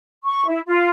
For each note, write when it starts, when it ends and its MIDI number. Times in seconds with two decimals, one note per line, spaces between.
0.25 0.43 85
0.47 0.59 64
0.66 0.89 65